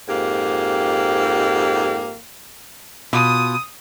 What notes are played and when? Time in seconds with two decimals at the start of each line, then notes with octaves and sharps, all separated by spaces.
0.08 F2 G#2 A#3 G4
3.13 B2 F4 D#6